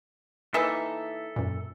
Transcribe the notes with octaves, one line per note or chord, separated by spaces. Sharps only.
E3 A#3 D#4 A4 E5
F#2 A#2